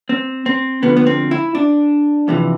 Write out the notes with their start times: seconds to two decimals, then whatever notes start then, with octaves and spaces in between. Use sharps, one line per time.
0.09 C4
0.46 C4
0.83 D2 D3 F3 B3
0.97 B3
1.07 C4
1.31 E4
1.55 D4
2.28 F2 C3 E3